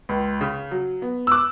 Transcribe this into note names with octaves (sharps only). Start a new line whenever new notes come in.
C#2
C#3
F#3
B3
E6
D6 F#6